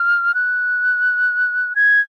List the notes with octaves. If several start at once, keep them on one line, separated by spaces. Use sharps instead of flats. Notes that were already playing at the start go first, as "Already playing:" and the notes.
Already playing: F6
F#6
G#6